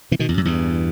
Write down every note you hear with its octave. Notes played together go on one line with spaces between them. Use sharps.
C3 E3
B2 D#3
E2
F#2
E2 G2